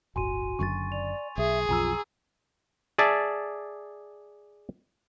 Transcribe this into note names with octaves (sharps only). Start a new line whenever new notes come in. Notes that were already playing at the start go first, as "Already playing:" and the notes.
D1 G1 F#4 G#5 C6 D#7
F#1 F#2 D3 C#6 A6
D5 F7
B1 G#4 E5
B1 F2 F4 G#5 A#5 E6
G#4 D5 E5 A5